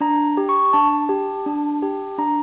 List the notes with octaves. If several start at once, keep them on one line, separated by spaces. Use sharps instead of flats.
D4 A#5
G4
C#6
D4 A5
G4
D4
G4
D4 A#5